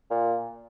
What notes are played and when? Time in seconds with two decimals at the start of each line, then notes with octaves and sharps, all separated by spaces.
0.11 A#2